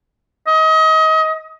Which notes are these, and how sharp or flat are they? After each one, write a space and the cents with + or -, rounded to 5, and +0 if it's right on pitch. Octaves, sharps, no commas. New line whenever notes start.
D#5 +30